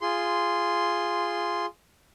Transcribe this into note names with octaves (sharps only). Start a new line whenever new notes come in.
F4 G#4 C6